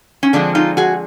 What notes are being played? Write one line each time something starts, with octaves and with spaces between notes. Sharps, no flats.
C#4
D3 F3 G#3 C4 D4
D#4 F4
F#4 G#4